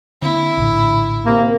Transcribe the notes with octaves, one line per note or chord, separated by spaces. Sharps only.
D3 A#3 C4 E4
A#1 A2 D3
C3 A#3